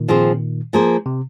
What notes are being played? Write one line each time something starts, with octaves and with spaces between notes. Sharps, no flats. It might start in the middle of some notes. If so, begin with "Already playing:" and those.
Already playing: A#2 D#3
F3 C4 G#4 C5
F3 A#3 G#4 C5
C3